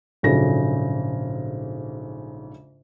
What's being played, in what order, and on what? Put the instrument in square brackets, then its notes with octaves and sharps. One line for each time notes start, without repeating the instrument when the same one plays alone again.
[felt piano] A#1 G#2 C#3 F#3 A4 A#6